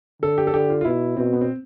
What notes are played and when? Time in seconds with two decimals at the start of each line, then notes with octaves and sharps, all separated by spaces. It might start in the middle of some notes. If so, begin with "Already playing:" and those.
0.22 D3 A4
0.38 G4
0.47 A4
0.54 D3 G4
0.70 F4
0.81 F4
0.85 B2 E4
1.17 B2 C4
1.33 B3
1.41 C4